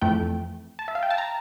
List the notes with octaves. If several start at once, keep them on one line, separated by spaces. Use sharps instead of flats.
F2 E3 A3 G5
A5
E5
F5
G5
A5
A#5